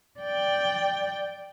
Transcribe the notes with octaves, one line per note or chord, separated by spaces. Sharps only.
D5 G5